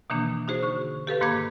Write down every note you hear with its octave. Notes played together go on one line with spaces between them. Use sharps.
B2 D#3 E3 A#3 D4
D#4 F#4 G#4 C5
D3 C#6
G4 A4 B4 F5
G#2 D#3 A#3 B5 D6 G#6